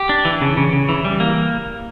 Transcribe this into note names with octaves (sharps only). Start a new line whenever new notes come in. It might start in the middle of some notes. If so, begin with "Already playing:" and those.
Already playing: G4
D4
E3
C#3
C#3
C#3
E3
G3
A#3